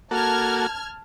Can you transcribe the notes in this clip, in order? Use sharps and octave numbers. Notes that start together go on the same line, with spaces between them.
A#3 F#4 A4 A5 F6 G#6